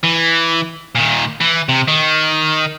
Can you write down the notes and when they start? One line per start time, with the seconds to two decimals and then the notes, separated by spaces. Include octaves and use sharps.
0.03 E3
0.95 A#2 D#3
1.41 E3
1.69 C3
1.88 D#3